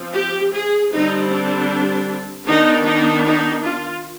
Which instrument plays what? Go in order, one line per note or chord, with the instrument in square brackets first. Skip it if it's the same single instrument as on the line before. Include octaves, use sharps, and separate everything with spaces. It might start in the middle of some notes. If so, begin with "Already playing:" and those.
Already playing: [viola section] F3 C4
G4
G#4
D3 G3 C4 D#4
D4
D#3 B3 D4 D#4
D#4
D#4
F4